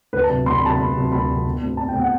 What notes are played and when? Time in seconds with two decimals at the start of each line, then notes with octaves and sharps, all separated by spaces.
0.13 D2 B4
0.24 A5
0.29 C3 F#3
0.46 D2 C6
0.56 B5
0.63 C3 F#3 A5
0.76 D2 B5
0.95 C3 F#3
1.12 D2 B5
1.29 C3 F#3
1.45 B1
1.62 B2 A3 C4
1.77 B1 A5
1.88 G5
1.94 B2 A3 C4
2.00 F#5